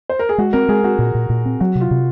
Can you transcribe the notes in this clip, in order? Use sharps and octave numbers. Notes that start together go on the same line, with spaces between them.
C5
A#4
G#4
G#3 F#4
C4 A#4
G#3 G#4
C4 F#4
A#2
A#2
A#2
C4
F#3 F#4
C3
F4
C3